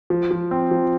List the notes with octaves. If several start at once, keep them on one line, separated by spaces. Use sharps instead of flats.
F3
F3
C4
F3